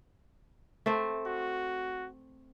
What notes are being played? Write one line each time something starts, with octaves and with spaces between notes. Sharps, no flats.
A3 C4
F#4